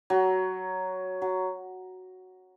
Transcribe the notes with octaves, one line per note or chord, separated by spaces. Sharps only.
F#3
F#3